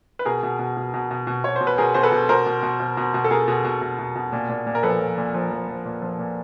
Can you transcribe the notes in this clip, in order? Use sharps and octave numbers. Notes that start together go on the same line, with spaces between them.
B4
B2 G#4 A#4
B2
B2
B2
B2
B2
B2
B2 C#5
B2 C5
B4
B2 G#4 A#4
B2 C5
A4 B4
B2
B2 A#4 C5
B2
B2
B2
B2
B2
A4
B2 G#4 A#4
B2
B2
B2
B2
B2
A#2
A#2
A#2
A#4
F3 A4 B4
F3
A#2
F3
F3
F3
A#2
F3
A#2